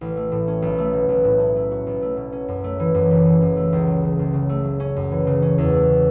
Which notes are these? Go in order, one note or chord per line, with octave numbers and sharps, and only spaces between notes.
A1
A3
A2
C#4
B1
A3
B2
B1
A2
C#4
A3
F#4
B1
A3
B2
C#4
F#2
A3
E3
F#2
F#1
E3
F#2
A3
C#2
F#3
C#3
C#2
C#3
A3
F#3
C#4
F#2
E3
C#3
C#4
E2
A3
C#3